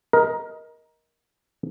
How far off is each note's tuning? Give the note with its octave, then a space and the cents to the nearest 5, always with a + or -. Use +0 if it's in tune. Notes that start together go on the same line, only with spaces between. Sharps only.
A#4 +15 D#5 +15